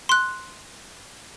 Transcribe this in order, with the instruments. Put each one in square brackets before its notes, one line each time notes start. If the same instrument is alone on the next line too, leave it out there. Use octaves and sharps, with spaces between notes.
[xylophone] C6 F#6